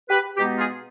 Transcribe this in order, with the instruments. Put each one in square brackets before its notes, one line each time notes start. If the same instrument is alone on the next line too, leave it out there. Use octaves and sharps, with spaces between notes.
[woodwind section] G4 B4
B2 G#3 B3 D#4 G4
F4 G#4